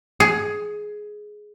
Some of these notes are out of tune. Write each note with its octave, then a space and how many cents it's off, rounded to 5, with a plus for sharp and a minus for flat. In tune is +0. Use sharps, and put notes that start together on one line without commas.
G#4 +10